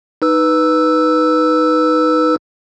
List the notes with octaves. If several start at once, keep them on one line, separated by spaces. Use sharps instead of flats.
D#4 B4 E6